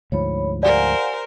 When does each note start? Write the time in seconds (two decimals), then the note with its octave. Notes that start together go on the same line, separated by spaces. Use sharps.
0.12 D2 G#2 F3 C#5 B5
0.63 G4 A#4 C5 D5 F5 F#5 G#5